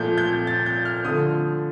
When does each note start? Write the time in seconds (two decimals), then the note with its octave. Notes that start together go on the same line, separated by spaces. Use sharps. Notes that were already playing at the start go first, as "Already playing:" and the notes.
Already playing: A#2 F3 A3 G6
0.18 G6
0.47 A6
0.66 G6
0.85 F6
1.05 D3 F3 A3 D#6